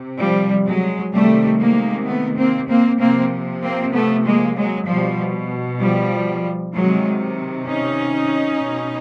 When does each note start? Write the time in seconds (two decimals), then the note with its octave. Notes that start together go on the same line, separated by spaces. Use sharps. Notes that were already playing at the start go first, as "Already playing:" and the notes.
Already playing: C3
0.19 F3 G3
0.66 F#3 G#3
1.13 C3 D#3 G3 A3
1.60 G#3 A#3
2.07 A3 B3
2.38 A#3 C4
2.69 A#3 C4
3.00 C3 F3 A#3 C4
3.62 A#3 C4
3.93 A3 B3
4.25 G#3 A#3
4.56 F#3 G#3
4.87 B2 F3 G3
5.80 F3 G3
6.74 C3 D#3 F#3 G#3
7.67 C#4 D#4
8.61 B2